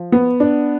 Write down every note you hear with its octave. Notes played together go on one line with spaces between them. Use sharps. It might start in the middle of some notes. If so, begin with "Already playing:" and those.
Already playing: F3
B3
D4